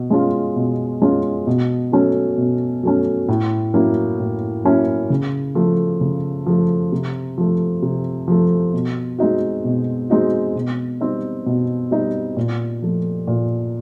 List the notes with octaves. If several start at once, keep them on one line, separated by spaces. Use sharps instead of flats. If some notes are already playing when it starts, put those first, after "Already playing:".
Already playing: B2
G#3 C#4 F4
B2
G#3 C#4 F4
B2
F#3 A3 C#4
B2
F#3 A3 C#4
A2
F#3 A#3 C#4 E4
A2
F#3 A#3 C#4 E4
C#3
F3 A3
C#3
F3 A3
C3
F3 A3
C3
F3 A3
B2
G#3 C4 D#4 F#4
B2
G#3 C4 D#4 F#4
B2
G3 C4 D#4
B2
G3 C4 D#4
A#2
F3 A3
A#2